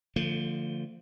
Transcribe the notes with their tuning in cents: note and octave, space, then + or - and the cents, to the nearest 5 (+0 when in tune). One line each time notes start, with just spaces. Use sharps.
D3 +0 F3 -10 A3 +40